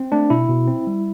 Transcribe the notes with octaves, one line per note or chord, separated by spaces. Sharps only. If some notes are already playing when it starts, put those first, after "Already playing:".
Already playing: C4
A3 D4
B2 E4
B2
C4
G3